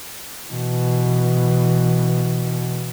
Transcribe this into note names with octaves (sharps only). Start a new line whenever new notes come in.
B2 E3